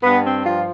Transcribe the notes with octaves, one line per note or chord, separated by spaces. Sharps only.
G2 B3
C4
F3 F4